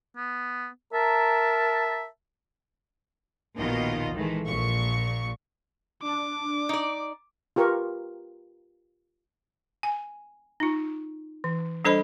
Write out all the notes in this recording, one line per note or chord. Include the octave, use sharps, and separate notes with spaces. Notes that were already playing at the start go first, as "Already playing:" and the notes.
B3
A#4 E5 A5
A#1 D#2 B2 D#3 F4 D#5
D#3 E3 G#3 A3
A#1 A#2 C#6
D4 D6
D#4 D5
F4 G4 A#4 B4 C#6
G#5
D#4 F4
E3
G3 D4 A4 C5 D#5 B5